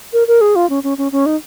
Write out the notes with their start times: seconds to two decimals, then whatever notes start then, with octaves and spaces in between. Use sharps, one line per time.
0.13 A#4
0.28 A#4
0.41 G#4
0.56 F4
0.70 C#4
0.84 C#4
0.98 C#4
1.12 C#4
1.26 D#4